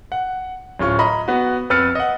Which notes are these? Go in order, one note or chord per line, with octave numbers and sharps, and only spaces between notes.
F#5
D1 C#4 F4 C#6
D#5 A#5 B5
B3 F#4
F2 B4 E6 F6 A6 C#7
D#5 F#5